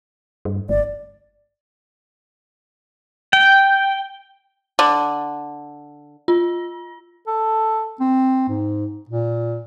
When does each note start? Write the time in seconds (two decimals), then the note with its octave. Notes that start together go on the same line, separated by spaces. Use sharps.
0.45 G2
0.69 G1 D5
3.33 G5
4.79 D3
6.28 F4
7.27 A4
8.00 C4
8.49 G#2
9.09 A#2